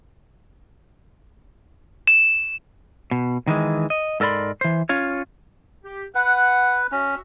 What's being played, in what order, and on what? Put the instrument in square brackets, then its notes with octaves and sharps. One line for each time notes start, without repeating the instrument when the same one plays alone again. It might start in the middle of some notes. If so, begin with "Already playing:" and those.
[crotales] E7
[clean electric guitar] B2
D#3 E3 G#3
D#5
G#2 A4 A#4 D5 B5 C6
E3 C5
C#4 F4 C#5
[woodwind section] G4
[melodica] B4 [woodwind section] F#5
[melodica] C#4 [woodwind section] F#4 E5